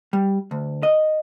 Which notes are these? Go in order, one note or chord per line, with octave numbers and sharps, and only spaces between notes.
G3
D2
D#5